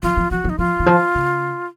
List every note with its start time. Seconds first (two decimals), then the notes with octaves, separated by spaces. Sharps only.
0.03 F3 F4
0.17 F3
0.31 F3 F#4
0.44 F#3
0.49 D#4
0.58 F3 F4
0.80 D#3
0.86 F3
1.15 C#3